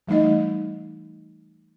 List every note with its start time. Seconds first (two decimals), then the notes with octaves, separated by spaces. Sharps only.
0.07 E3 G3 A3 D#4 D#5